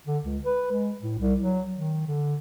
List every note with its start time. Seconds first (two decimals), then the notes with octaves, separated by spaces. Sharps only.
0.07 D3
0.24 C#2
0.45 B4
0.72 G#3
1.02 A2
1.19 C2
1.40 F#3
1.77 D#3
2.07 D3